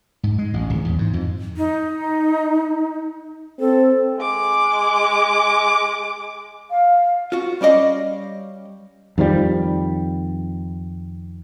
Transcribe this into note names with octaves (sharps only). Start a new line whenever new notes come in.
G#2
G#3
A1
D1
E2
G#2
F2
D#4
C4 A4
G#3 D6
F5
F4 F#4
G3 C#4 D5 D#5 F5
F2 D#3 F3 G3